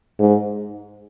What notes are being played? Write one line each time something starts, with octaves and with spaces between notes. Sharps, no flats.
G#2